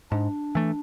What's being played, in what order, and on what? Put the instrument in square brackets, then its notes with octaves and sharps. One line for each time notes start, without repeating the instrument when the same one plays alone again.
[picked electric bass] G#2 [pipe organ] D4
[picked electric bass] E3 A3